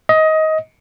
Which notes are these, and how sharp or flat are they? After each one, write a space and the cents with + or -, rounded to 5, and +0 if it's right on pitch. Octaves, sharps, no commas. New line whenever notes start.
D#5 +20